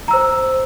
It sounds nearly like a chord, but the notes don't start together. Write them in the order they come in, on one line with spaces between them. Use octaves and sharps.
A#5 E6 C5